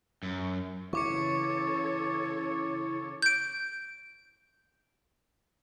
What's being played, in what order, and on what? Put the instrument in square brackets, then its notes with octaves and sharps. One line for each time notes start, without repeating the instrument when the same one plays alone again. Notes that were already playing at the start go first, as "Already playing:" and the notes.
[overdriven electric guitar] F#2
[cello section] C#3 A4 C#5 [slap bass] E3 [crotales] C#6 D6 C#7
[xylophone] G6 D7